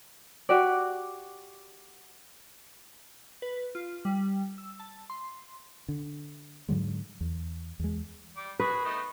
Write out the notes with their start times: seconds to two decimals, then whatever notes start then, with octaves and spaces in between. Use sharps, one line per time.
0.49 F#4 G4 D5
3.42 B4
3.75 F4
4.05 G3
4.58 E6
4.80 A5
5.10 C6
5.88 D3
6.69 G#2 D3 F#3 G#3
7.21 E2
7.79 E2 G#3
8.37 G3 D6
8.60 F#4 G#4 B4
8.85 A3 B3 D#4